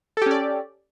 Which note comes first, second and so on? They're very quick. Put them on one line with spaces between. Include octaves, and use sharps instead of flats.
A4 G4 C#4 D5